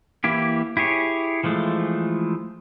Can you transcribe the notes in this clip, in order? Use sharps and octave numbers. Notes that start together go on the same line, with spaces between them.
E3 A#3 E4 G4
E4 G4 G#4 C#5
E3 F3 G#3 A3